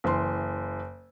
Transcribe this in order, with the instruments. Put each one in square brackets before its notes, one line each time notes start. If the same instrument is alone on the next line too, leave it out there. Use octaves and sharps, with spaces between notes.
[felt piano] F#1 E3 C6